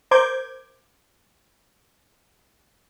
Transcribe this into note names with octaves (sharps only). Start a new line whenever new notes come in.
A#4 C5 D6 G6 G#6